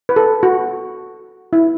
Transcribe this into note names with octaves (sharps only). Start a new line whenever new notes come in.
B4
A4
F#4
E4